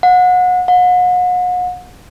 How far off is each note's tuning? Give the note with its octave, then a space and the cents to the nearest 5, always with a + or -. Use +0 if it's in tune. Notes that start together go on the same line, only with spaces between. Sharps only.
F#5 -30
F#5 -40